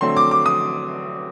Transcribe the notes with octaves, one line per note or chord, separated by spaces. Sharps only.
D3 F#3 A3 C4 C6
D6
D6
D#6